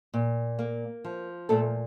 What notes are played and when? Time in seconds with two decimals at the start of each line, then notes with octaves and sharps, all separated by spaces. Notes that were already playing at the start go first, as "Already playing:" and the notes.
0.14 A#2
0.59 A#3
1.04 F3
1.49 A#2 A3 A4